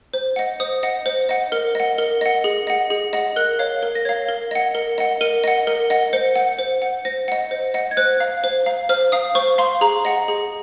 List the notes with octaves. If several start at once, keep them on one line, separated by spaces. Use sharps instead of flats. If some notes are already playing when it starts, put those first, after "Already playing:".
C5
D#5 F#5
C5 D#6
D#5 F#5
C5
D#5 F#5
A#4 F6
D#5 F#5
A#4
D#5 F#5
G#4
D#5 F#5
G#4
D#5 F#5
A#4 F#6
C#5 F5
A#4
A#6
C#5 F5 G#6
A#4
D#5 F#5
A#4
D#5 F#5
A#4 D#7
D#5 F#5
A#4
D#5 F#5
C5 C#7
F#5
C5
F#5
C5 A#6
D#5 F#5
C5
D#5 F#5
G#6
C5 F#6
F5
C5
F5
C5 F6
F5 D#6
C5 C#6
F5 C6
G#4 A#5
D#5 F#5
G#4